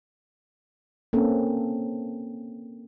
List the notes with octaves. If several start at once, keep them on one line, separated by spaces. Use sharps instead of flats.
A#3 C4 C#4 A4